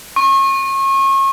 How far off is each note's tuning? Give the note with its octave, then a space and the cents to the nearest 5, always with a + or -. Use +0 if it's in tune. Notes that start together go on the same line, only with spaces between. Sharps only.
C#6 -35